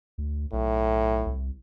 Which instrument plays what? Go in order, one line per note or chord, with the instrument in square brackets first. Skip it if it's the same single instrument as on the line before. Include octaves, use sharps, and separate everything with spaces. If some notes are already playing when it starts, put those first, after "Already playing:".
[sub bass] D2
[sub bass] B1 [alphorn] A2
[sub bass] C2